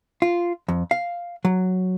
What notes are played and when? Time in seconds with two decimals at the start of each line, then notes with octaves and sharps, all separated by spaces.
0.22 F4
0.68 F2
0.91 F5
1.45 F#3